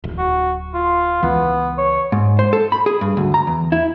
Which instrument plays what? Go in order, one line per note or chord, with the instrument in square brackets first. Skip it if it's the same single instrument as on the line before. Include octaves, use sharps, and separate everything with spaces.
[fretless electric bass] D1
[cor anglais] F#4
F4
[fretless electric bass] C#2 E3 [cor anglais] B3
[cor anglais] C#5
[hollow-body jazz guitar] G#2
C5
A4
B5
G#4
G2
D2
A#5
E2
E4